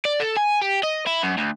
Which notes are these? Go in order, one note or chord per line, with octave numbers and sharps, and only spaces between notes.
D5
A4
G#5
G4
D#5
E4
F#2
D2